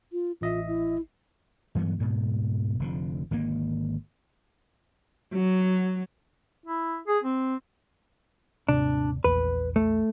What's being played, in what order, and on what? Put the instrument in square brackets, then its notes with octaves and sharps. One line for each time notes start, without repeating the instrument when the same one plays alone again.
[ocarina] F4
[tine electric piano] A1 D#5 E5 [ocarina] F4
[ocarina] E4
[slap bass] G2 E3 F#3 B3
D2 G#2 B2
F1 D3 F3
G#1 D3 D#3 A#3
[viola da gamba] F#3
[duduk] E4
G#4
C4
[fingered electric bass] D#1 G#2 C3 [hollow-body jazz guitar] D4
[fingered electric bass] A#1 E2 [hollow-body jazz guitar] B4
[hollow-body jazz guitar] A3